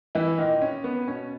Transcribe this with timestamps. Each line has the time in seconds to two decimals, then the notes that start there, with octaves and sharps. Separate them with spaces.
0.15 E3 E4
0.38 A#2 D#3 D#4
0.62 C#4
0.84 B3
1.07 B2 C#4